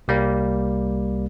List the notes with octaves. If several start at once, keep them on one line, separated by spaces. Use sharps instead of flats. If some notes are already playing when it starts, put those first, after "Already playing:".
C2 G3 A#3